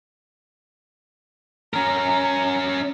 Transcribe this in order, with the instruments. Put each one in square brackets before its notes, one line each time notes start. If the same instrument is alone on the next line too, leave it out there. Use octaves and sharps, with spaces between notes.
[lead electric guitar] C#4 A#4 [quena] A#5